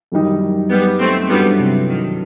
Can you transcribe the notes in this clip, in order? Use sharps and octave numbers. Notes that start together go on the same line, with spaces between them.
F#2 D#3 G3 D#4
G3 B3
A3 C4
G2 F#3 G3 A3 B3 E4
C3
D#3